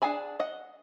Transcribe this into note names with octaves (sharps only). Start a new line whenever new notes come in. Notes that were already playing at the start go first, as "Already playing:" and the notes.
D4 G#4 F#5 G#5 B5
D#5 F#5